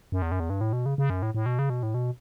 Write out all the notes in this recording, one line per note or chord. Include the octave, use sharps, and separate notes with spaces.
F#2
E2
F#2
E2
G2
A2
B2
C#3
C#3
F#2
A2
A2
B2
C#3
B2
A2
B2